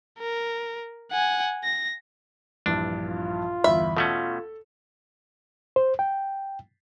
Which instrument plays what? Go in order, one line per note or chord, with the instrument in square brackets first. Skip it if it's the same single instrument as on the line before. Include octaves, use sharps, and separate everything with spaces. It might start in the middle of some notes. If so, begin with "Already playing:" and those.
[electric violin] A#4
F#5 G#5
A#6
[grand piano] A#1 G2 E3 [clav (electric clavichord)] D4
[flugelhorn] F4
[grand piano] G1 E2 B5 [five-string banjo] E5
[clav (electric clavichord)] B2 A3 C#4 [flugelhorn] F4 [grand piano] A4
[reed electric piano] C5
G5